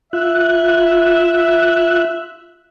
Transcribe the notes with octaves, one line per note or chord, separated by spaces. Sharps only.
F4 E5 F#6